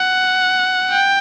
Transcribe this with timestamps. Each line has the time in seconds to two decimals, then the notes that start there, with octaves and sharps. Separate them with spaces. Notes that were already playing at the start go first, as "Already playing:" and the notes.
Already playing: F#5
0.91 G5